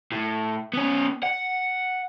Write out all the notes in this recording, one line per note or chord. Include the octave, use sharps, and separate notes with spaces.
A2
B3 C#4
F#5